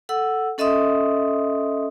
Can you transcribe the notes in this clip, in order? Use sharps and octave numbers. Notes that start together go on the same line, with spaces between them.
A4 F#5 E6
C#4 A4 D#5 E5 C6 D#6